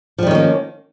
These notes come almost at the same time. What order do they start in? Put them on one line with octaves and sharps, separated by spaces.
F3 G3 D#3 C#4 A#3